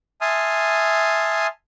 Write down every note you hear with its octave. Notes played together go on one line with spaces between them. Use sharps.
E5 G#5 A5 C6 D#6 F6